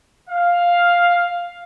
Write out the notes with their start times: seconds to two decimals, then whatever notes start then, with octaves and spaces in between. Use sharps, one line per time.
0.30 F5